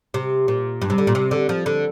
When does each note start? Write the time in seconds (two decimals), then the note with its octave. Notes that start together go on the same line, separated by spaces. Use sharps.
0.14 C3
0.48 A#2
0.82 G2
0.90 C3
0.98 D3
1.07 A#2
1.15 C3
1.31 D3
1.49 F3
1.66 D3